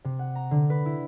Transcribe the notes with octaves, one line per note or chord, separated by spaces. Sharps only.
C3
F#5
A#5
D3
B4
E4